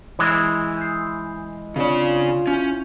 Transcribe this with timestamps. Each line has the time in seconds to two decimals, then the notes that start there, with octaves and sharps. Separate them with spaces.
0.19 E3 G#3
0.77 G6 C7
1.76 C#3 C4 D4 F4 C#5 D5
2.47 C#4 E4 F#4 G6